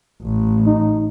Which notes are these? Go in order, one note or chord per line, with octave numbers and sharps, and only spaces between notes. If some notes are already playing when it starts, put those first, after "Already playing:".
A1
D#4